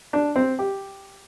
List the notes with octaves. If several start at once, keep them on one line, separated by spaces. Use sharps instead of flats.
D4
C4
G4